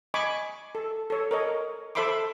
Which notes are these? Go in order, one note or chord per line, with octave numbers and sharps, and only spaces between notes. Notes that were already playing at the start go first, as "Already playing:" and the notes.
D#5 G#5 B5 C#6 D6
A4
A4 C#5
A#4 C#5 D#5
A4 C5 E5 B5 C6 D6